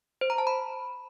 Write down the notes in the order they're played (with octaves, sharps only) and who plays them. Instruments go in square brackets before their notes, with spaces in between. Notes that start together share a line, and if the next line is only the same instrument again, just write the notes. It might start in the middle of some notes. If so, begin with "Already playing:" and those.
[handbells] C5
A#5
A5
B5